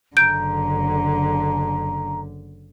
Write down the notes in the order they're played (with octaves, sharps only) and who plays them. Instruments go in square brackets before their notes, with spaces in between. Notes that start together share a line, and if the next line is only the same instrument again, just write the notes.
[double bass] F#1 [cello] D3 [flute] A#5 [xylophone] G6 D7